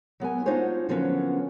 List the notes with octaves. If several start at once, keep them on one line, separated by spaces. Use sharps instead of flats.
F#3 B3 A#4 G#5
D4 D#4 F4 F#4 C5 C#5
D3 F3 F#3 A#3 B3 C#4